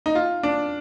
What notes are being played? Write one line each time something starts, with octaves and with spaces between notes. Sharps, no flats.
D#4
F4
D4